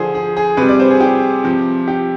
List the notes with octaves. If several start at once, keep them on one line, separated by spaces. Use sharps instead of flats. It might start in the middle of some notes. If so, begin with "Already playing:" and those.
Already playing: D3 F3 G#4 C5
G#4
G#4
C3 G3 B4
D5
C5
G#4
G4
C3 F3
G4